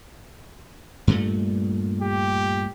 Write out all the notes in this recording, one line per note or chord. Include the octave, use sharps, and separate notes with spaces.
G2 A#2 A3
G4